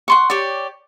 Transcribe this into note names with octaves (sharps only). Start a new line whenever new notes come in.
F#5 C6 C#6
G4 C#5 D5